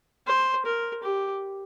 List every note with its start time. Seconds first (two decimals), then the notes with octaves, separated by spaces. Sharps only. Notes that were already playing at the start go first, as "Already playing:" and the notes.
0.27 C5
0.65 A#4
1.03 G4